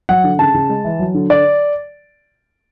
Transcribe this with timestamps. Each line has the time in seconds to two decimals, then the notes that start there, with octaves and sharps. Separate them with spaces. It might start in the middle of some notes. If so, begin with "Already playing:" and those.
0.09 F#3 F#5
0.24 D3
0.39 C#3 A5
0.54 C#3
0.69 G#3
0.84 E3
0.99 F#3
1.14 D3
1.30 D3 D5